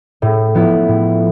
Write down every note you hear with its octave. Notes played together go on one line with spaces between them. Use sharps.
A2
F3 B3 E4
A2